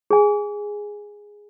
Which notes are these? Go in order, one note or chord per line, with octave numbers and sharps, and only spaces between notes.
G#4 G#5